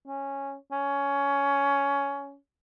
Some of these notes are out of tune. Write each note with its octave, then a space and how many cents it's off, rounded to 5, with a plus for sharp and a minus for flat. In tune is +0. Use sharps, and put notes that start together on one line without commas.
C#4 -10
C#4 +15